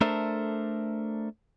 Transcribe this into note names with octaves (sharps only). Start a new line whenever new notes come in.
A3 D4 A4 A#4 C5 E5